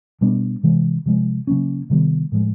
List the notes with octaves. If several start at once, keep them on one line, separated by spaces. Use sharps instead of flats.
B2 G3 B3 D4
C3 E3 G#3
C3 F3 G#3
C#3 F#3 A#3 C#4
C3 D#3 G3 B3
A2 F3 G#3